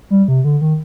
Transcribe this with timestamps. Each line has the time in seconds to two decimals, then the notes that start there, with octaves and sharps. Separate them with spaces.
0.10 G3
0.28 C3
0.44 D3
0.61 D#3